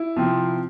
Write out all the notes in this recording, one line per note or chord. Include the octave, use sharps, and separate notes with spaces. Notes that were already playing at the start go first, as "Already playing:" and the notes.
Already playing: E4
C3 F3 C4